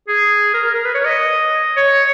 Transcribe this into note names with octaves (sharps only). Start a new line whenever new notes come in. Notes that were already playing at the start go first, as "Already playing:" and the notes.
G#4
A#4
A#4
A#4
B4
C#5
D#5
C#5